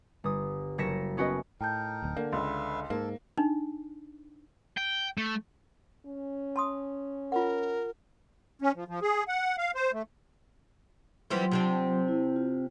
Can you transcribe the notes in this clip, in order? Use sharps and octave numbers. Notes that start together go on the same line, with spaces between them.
G1 D#6
F#1 C#5 A#6 B6 C#7 E7
B3 C#4 F#4 B4 D#5
A2 D#4 A#4 G5 A5 G6
D1 D2
D3 A#3
C#2 B4 E5 F5 C6
G#2 A#3 A4
D4 D#4
G5
A3
C#4
A5 C6 D#6
F4 A#4 F#5
C#4
F3
F3
G#4
F#5
F5
C5
A3
E3 F#3 G3 C4 F4 C6
C3 C4 D4
E4
F4